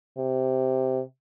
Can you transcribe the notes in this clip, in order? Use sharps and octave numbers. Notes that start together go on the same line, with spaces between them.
C3